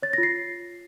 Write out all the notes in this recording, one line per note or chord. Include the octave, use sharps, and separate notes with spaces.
C#5 A6
A#6
F4
C7